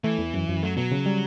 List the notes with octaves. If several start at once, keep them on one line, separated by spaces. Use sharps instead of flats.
E3 A3
E2
F#2
F#2
F#3 A3
B2 F#3
C#3
G3